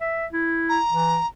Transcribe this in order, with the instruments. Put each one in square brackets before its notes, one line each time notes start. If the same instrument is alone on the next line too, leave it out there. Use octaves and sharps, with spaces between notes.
[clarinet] E5
E4
[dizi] A#5
[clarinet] E3